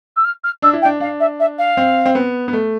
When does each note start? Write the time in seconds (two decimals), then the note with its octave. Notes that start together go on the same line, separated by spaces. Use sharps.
0.16 E6
0.24 F6
0.43 F6
0.62 D4 E6
0.73 E4
0.82 G5
0.85 D4
1.00 D4 F5
1.20 E5
1.39 E5
1.58 F5
1.77 C4
2.05 C4
2.15 B3
2.48 B3
2.53 A3